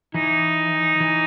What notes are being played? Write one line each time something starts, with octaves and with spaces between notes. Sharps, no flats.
E3 D#4
E3